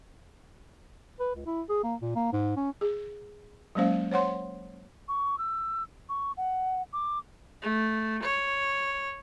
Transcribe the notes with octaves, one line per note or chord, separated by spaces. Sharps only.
B4
C#2
E4
G#4
A#3
A#2
A#3
G#2
C#4
G#4
F#3 G#3 A#3 C#4 C5 F5
C5 C#5 F#5 C6
C#6
E6
C#6
F#5
D6
A3
C#5